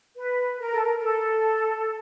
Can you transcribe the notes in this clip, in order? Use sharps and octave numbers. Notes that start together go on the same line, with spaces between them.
B4
A#4
A4
A#4
A#4
A4